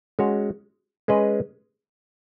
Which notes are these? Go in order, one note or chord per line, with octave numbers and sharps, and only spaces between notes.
G#3 C#4 F#4 C#5
G#3 C#4 G#4 B4 D#5